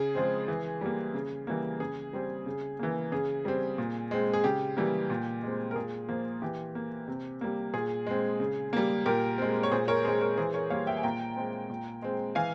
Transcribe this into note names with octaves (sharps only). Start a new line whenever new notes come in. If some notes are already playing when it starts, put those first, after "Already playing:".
Already playing: C#3 G#4
F3 G#3 C4
E3
G3 A#3
C#3
E3 G3 A#3
C#3 G#4
G3 C4
C#3
E3 A#3
C#3 G#4
G3 C4
A#2
G#3 C4
G#4
C#3 G4
E3 G3 A#3
A#2
G#3 C4
A#4
A#2 G#4
F3 A#3
E3 G4
A#3
C3
G3 A#3
A#2 G#4
G#3 C4
C#3
G3 A#3
A#2 G4 A#4
G#3 C4
C#5
A#2 G#4 C5
A#4 C#5
G#3 C4 G#4 C5
A#4 C#5
E3 G#4 C5
A#4 C#5
G3 A#3 C#5 F5
E5 G5
G#5
A#2 G5 A#5
G#3 C4
A#2
G#3 C4
E3 F5 G#5